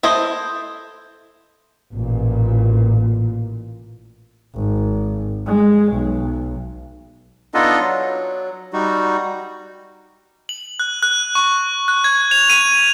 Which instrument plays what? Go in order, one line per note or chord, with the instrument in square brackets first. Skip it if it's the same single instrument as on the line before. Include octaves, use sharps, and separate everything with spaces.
[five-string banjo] E4 A4 C5 D#5
[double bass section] A1 A#2
[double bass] G#1
G#3
B1
[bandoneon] B3 D4 D#4 F4 A4 D#5
F#3
G3 D#4 F#4
[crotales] F#7
F#6
F#6
C#6
F#6
G#6
F7
D#7